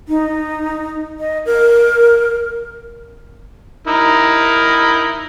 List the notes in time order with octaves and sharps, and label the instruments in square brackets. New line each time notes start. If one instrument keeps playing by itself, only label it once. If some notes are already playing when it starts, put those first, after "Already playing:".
[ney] D#4
D#5
A#4
[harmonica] D#4 E4 A#4